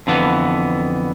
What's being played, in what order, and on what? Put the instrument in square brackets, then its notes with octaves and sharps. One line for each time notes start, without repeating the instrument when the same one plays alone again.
[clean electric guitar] F2 D3 E3 B3